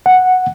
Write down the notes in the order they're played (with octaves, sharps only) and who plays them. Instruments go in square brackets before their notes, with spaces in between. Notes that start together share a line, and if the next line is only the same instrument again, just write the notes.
[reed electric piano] F#5